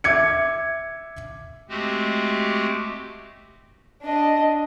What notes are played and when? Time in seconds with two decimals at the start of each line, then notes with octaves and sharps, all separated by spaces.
0.04 E5 D6 G#6 C#7
1.69 G#3 A3 C4 F#4 G4
4.02 D4 D#5